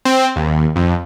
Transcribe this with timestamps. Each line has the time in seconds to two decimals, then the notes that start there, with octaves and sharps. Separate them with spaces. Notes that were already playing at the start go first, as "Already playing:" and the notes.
0.05 C4
0.36 D#2
0.76 F2